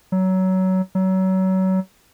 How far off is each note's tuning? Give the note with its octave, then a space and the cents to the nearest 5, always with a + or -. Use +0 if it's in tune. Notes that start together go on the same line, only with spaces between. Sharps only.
F#3 +20
F#3 +30